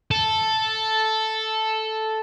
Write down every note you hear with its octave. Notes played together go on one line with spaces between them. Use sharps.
A4